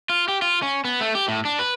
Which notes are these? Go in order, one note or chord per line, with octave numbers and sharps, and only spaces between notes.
F4
G4
F4
C#4
B3
A3
G4
A2
D4
B4